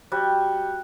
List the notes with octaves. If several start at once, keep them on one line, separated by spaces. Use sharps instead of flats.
G3 F#4